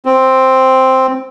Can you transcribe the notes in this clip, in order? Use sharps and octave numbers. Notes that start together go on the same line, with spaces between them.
C4